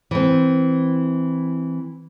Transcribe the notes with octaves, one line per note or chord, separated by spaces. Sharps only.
E3 C4